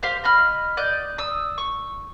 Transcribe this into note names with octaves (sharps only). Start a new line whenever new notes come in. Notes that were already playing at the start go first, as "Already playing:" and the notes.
G4 C5 F5 F6
D#5 B5 F6
D5 D#5 F#6 G6
D#6 E6
C#6